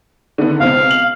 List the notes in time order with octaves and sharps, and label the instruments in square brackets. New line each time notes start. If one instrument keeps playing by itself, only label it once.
[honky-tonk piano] D3 D#3 B3
[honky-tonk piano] C#2 B2 C4 [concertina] F5
[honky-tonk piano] F#7